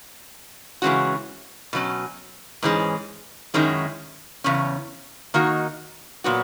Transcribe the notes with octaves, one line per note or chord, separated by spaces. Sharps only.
C#3 E3 G#3 C#4 F#4
B2 F#3 C#4
G#2 E3 G#3 C#4
F#2 D#3 G#3 C#4 E4
E2 C#3 C#4
D#3 A#3 D#4 F#4
A#2 F#3 B3 F#4